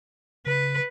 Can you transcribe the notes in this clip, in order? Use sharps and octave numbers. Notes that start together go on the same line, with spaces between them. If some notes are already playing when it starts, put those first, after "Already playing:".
C#3 B4